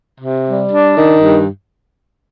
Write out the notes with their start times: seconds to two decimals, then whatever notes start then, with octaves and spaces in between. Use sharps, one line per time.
0.21 C3
0.46 G3
0.70 D4
0.94 D#3
1.19 G2